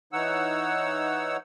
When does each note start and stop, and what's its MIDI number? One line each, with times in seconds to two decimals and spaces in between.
0.13 1.37 52
0.13 1.37 63
0.13 1.37 73
0.13 1.37 78
0.13 1.37 88